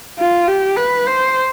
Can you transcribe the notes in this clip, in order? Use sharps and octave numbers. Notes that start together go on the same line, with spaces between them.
F4
G4
B4
C5